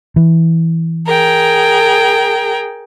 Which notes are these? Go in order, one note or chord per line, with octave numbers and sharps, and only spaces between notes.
E3
G#4 A#4 G5